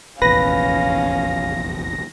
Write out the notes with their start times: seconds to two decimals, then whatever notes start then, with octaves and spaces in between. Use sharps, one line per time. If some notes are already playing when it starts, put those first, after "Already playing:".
0.22 F1 A#1 E2 C#4 B4 F5 A#6